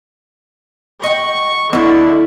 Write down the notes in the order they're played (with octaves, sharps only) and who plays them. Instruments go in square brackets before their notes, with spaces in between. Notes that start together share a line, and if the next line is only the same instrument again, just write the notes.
[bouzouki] D#5 F#5 G5 [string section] C#6
[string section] D3 [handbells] B3 D#5 C#6 [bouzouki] D4 F4 [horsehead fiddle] E4